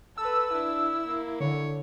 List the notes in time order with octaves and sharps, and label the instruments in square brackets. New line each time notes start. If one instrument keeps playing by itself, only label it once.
[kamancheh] A4 B4 [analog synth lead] E6
[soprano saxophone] D4 [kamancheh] E4
[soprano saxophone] A#3
[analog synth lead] D3 [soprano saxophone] C#5